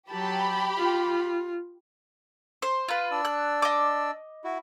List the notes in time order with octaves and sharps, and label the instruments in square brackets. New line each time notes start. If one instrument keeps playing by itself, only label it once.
[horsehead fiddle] F#3 A5 [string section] G4 B5
[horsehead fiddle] F4
[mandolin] C5
[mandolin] F4 B4 [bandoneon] C6
[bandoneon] D4 D5 E6
[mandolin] F#6
D#5 D6
[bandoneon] E4 F#4